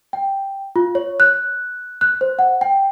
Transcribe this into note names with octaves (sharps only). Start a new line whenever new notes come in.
G5
F4
C#5
F#6
F#6
C5
F#5
G5